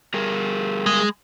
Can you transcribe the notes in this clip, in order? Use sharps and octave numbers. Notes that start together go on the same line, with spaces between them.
G3 G#4 A#4
G#3